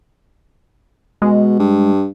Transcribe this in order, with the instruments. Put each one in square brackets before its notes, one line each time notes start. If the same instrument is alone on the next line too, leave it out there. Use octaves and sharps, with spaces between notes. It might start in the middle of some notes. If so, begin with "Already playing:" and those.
[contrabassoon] B2 [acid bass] G#3
[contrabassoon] G2